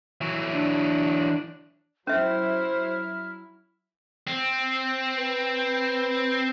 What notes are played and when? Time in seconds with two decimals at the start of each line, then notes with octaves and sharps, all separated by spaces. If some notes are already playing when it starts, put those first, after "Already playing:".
0.21 E3 F#3
0.54 D4
2.07 F#3 C#4 E4 C5 E5 F6
4.27 C4
5.17 B4